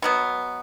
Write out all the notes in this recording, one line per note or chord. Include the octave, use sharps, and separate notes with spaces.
B2 F#3 B3